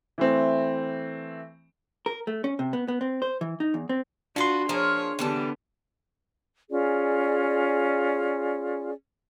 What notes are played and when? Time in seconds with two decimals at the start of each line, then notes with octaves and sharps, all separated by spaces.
0.18 E3 A3 C4
2.06 A#4
2.27 A3
2.44 C#4
2.59 C3
2.73 B3
2.88 B3
3.01 C4
3.22 C5
3.41 E3
3.60 D#4
3.74 E2
3.89 C4
4.36 D4 F4 F#4 B4 C6
4.69 F3 A#3 G#4 A#4 C#5
5.19 D3 E3 G3 B3 A4
6.70 C#4 F4 G#4 D5